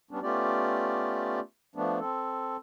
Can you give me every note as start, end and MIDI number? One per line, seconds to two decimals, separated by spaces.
0.11 0.19 55
0.11 0.19 59
0.11 0.19 61
0.11 0.19 62
0.23 1.40 57
0.23 1.40 59
0.23 1.40 61
0.23 1.40 65
0.23 1.40 67
0.23 1.40 74
1.75 1.99 53
1.75 1.99 57
1.75 1.99 59
1.75 1.99 62
2.00 2.57 60
2.00 2.57 69